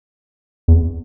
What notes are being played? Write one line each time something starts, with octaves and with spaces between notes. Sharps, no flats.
E2